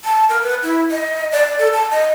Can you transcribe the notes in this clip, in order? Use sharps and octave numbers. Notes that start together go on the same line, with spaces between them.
A5
A#4
B4
E4
D#5
D5
A4
A5
D#5